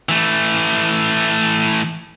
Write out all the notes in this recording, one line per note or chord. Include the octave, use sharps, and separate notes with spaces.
E3 A3